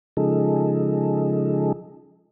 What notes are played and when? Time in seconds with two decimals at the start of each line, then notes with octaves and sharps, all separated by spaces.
0.17 C#3 F3 G#3 D#4 G#4 A4